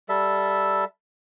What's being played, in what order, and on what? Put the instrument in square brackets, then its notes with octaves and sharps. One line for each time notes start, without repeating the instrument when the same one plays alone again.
[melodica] G3 A4 E5